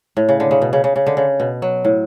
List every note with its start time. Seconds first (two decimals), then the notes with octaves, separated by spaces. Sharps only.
0.17 A2
0.29 C#3
0.40 D3
0.51 C#3
0.62 B2
0.73 C#3
0.84 C#3
0.96 C#3
1.07 D3
1.17 C#3
1.40 B2
1.62 F#3
1.85 A2